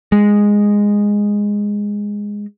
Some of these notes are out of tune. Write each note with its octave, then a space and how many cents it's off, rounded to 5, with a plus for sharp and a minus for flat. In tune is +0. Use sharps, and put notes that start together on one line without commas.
G#3 -10